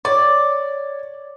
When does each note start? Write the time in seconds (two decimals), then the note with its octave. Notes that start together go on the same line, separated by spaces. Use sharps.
0.05 C#5 D5